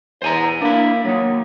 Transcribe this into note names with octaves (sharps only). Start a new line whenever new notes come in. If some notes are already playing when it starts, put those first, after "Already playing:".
E2 C5 G#5 A#5
A#3 D4 E4
F#3 A#3 D#4